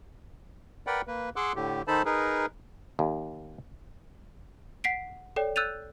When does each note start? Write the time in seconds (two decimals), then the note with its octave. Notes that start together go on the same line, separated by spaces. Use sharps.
0.87 A#4 B4 D5 F#5 G5 B5
1.07 A#3 B4
1.36 G#4 F#5 C6 D6 E6 F#6
1.56 A2 D3 G4
1.88 D#3 D#4 A4 C5 A5 B5
2.05 D#4 G#4 A#4 B4
2.99 D#2
4.84 F#5 B6 C7 D7
5.36 A4 C#5 D5 G5
5.56 E6 F#6 G6 A6 D#7 F7